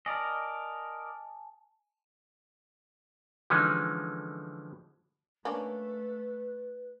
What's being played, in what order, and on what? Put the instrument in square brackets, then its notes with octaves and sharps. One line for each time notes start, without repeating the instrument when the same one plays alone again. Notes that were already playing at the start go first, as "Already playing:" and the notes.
[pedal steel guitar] A#4 D5 D#5 [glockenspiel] G#5 A5
[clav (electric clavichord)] D3 E3 F3 G#3 C#4 D#4
[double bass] A3 [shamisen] A#3 C#4 D4 [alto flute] B4